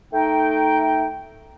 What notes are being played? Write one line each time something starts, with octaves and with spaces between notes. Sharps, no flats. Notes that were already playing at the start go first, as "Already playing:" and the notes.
A3 D#4 G5